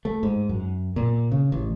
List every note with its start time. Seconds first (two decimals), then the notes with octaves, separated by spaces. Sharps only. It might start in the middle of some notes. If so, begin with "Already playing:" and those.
0.05 A3
0.23 G#2
0.49 F#2
0.96 A#2
1.32 C#3
1.52 A1